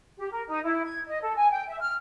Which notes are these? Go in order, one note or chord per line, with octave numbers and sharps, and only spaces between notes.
G4
A#4
D#4
E4
G#6
D#5
A4
G#5
G5
E5
F6